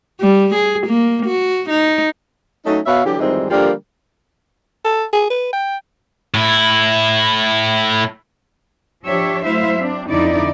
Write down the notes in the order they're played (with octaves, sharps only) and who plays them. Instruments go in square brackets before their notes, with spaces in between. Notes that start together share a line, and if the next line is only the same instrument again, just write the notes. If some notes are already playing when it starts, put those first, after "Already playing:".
[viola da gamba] G3
G#4
A#3
F#4
D#4
[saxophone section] F#3 A3 C#4 D#4
B2 B4 C#5 E5 F5
D3 E3 F#3 G4
F2 G#2 D#3 E3 G3 C4
D3 F3 G3 A#3 G4 A#4
[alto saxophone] A4
G#4
B4
G5
[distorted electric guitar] A2 E4
[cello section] F3 D4 G4 C#5 E5
F#3 A3 E4 C5 E5 F5
C4 D4
F2 D3 D#4 E4 D5